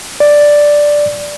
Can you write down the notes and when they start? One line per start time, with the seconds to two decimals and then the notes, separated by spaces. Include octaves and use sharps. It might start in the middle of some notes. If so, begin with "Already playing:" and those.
0.20 D5